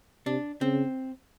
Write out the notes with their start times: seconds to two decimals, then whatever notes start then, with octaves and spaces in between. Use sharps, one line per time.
0.26 C3 D4
0.61 C#3 C4